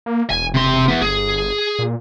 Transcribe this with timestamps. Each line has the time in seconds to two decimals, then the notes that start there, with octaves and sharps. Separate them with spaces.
0.06 A#3
0.30 E1 G#5
0.54 C3 C6
0.88 E3 B3
1.01 G1 G#4
1.79 A#2